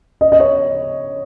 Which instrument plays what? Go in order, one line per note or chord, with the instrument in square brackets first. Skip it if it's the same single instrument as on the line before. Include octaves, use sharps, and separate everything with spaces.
[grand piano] D#5
D#5
C#5